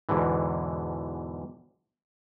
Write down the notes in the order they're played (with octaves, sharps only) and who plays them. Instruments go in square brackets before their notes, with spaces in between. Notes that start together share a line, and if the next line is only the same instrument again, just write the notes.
[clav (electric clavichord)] E2 G#2 B2 D3 E3